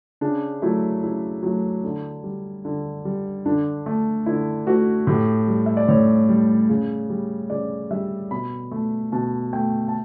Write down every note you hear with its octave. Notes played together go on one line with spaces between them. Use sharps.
C#3 D4
F#3 A3 E4
C#3 E4
F#3 A3
D3
G3
D3
G3
D3 D4
A3
D3 E4
A3 F#4
A2 G4
G3
E5
D5
A2 C#5
G3
C#3
G3
C#3 D5
G3 E5
B2 B5
A3
B2 A5
A3 G5
A5